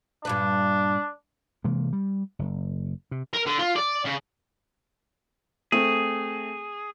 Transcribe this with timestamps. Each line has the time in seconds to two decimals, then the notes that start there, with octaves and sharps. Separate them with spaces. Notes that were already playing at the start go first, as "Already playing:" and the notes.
0.25 G2 A#2 D4 B4
1.64 C3 E3 G#3 A#3
1.93 G3
2.39 F#1
3.11 C3
3.33 A#4
3.46 D3
3.59 F4
3.76 D5
4.05 C#3
5.72 A3 C4 G#4